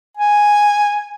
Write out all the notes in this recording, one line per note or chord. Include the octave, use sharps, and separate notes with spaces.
G#5